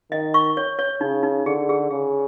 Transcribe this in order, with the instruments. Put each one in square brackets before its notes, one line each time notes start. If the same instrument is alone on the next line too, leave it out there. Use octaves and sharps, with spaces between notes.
[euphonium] D#3 [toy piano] D#5
[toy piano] C#6
C#5
C#5
[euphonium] C#3 [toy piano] D#4
[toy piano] D#4
[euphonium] D3 [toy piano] G#4
[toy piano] G#4
[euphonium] C#3 [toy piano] G#4